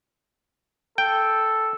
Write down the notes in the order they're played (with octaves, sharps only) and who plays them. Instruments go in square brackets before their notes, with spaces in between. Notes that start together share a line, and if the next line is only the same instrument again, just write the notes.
[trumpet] A4 [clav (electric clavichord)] G5